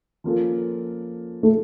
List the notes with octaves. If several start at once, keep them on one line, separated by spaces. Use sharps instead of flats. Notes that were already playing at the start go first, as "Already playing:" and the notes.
F3 A#3 C#4 F4 A4
A3